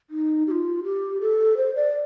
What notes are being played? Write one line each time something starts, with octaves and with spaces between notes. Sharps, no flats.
D#4
G4
F4
G4
A4
C5
D5